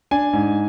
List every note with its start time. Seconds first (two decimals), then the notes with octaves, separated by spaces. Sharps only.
0.11 D4 G#5
0.33 G#2